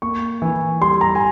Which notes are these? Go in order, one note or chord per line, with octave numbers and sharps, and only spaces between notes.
A#3 C#6
E3
G3 C6
A#5
G#5